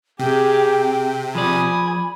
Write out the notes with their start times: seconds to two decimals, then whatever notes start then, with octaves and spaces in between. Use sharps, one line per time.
0.19 C3 G4 G#4 G5
1.35 F3 D5 G#5 B5 D#6